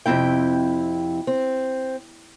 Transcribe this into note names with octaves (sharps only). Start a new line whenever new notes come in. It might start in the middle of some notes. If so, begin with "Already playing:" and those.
F2 C3 C4 E4 G5
C4